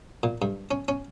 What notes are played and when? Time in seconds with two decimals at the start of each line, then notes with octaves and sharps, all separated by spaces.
0.23 A#2
0.42 G2
0.71 C#4
0.88 C#4